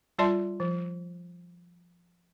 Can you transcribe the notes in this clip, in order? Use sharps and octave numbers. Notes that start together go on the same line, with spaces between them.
G3 F4 D5 E5 A5 C6
F3